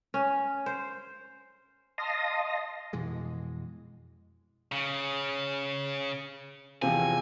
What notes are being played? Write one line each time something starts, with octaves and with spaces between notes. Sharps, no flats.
C#4
C5
D#5 F5 A5 C6 D#6 A#6
F2 B2 E3 G#3
C#3
E2 C3 F3 G#5